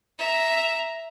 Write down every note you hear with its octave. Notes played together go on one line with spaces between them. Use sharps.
E5 A#5